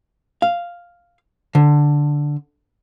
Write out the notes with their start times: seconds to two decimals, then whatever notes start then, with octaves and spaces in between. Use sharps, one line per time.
0.42 F5
1.55 D3